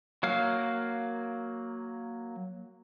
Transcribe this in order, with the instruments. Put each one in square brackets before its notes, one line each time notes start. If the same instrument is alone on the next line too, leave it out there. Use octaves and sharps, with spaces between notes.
[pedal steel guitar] F#3 A#3 F5